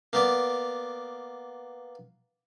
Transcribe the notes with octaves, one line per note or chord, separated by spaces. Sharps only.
A#3 B3 D5